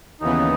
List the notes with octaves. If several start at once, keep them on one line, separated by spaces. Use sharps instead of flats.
D#2 C#3 E3 B3 D#4